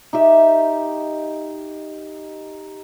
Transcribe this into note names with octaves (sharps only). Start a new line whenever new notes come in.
D#4 G4 E5